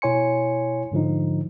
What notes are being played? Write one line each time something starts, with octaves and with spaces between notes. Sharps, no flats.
B2 E4 C#5 G#5 C6 C#7
G#2 D3 F3 D#4